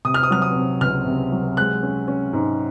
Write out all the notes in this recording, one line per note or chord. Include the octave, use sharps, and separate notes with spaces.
C3 D#6
F6
D#6
F#3 F6
D#6
C3
C#2 F6
C3
F#3
G#3 F#6
C#4
C#4
G#2